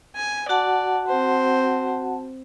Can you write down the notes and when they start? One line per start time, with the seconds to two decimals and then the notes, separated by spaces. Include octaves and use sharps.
0.16 G#5
0.49 F#4 D5 F#5 A5
1.07 C4 C5